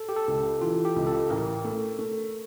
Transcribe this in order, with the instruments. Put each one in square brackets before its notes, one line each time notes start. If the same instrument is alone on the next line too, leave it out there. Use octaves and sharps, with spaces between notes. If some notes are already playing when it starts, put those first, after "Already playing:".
Already playing: [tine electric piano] A4
G4
A4
[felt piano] C#2
[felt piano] E3 [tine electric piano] F4
[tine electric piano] G4
[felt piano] C#2
[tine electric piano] A4
[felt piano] A1 [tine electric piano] A#4
[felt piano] A3
A3